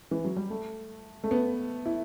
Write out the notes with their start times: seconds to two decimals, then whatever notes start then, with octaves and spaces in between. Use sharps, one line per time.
0.11 E3
0.25 F#3
0.37 G3
0.50 A3
1.24 A3
1.31 B3
1.86 E4